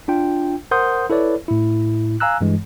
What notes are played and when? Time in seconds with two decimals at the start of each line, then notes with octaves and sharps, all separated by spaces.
0.08 D4 F4 G5
0.71 A#4 C5 F#5 C6 D#6 G6
1.10 E4 A4 B4 C#5 D5
1.48 A2 E4
2.20 F5 G#5 A#5 E6 F#6
2.41 G2 E3 G#3